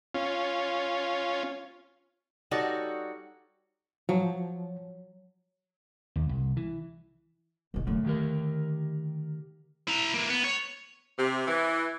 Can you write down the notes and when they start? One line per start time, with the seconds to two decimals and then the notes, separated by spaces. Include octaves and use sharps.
0.15 C#4 F4
2.51 G3 D#4 F#4 A4 C#5 D5
4.09 F3 F#3
6.16 D#2
6.29 C2
6.57 E3
7.74 A#1 D#3
7.87 F#2 D3 A3
8.05 D#3 G4 A#4
9.88 E4 A#5
10.14 E3 A#3
10.29 B3
10.45 C#5
11.18 C3
11.47 E3